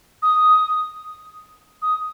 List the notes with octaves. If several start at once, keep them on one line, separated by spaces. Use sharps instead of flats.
D#6
D#6